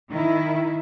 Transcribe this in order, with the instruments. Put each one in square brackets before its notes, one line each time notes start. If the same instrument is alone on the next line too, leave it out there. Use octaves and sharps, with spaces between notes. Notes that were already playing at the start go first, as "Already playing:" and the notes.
[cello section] D#3 E4